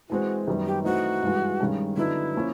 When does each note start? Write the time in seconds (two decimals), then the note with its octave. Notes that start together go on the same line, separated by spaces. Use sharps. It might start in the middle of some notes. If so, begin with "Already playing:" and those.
0.09 E3 G#3 C4 F#4
0.47 F#2 D#3 G3 B3
0.66 G4
0.84 E3 A3 C4 D#4 F#4
1.23 G2 E3 G#3
1.60 G2 D#3 G#3 C#4
1.97 D3 F#3 B3 D#4 E4
2.36 F3 A#3 C#4